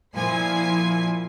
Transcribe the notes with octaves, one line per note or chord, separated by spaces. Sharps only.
A#2 F3 E4 G#5 C7